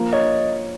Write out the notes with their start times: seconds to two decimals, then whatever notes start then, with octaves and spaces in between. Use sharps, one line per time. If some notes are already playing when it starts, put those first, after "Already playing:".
Already playing: F3 A#3
0.13 C#5 D#5